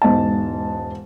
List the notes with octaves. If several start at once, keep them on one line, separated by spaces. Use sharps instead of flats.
E1 G#2 D#5 A5